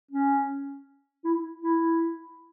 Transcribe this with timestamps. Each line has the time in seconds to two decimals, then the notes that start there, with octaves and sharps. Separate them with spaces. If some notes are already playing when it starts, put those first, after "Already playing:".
0.11 C#4
1.25 E4
1.62 E4